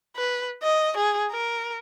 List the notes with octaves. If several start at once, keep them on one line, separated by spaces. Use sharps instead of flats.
B4
D#5
G#4
A#4